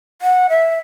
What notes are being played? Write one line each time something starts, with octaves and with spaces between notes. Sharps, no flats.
F#5
E5